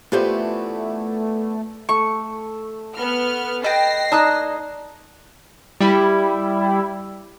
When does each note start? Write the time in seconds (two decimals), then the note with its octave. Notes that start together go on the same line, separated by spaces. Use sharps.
0.12 E3 A3 B3 D4 F4 G4 C5
1.89 A3 C#6
2.94 B3 F6
3.64 B4 D#5 G5 A#6 C7
4.12 D#4 D5 D#5 A5 D#6 F#6
5.80 G3 E4